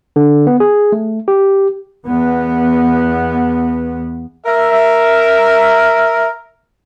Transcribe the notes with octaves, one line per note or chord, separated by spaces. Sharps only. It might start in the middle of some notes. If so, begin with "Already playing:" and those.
D3
B3
G#4
A3
G4
E2 B3
A#4 E5